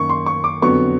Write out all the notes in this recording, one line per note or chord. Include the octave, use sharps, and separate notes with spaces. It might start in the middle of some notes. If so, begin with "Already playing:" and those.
Already playing: F#2 D#3 A#3 C#6
C6
C#6
D6
F2 D3 F#3 B3 C#6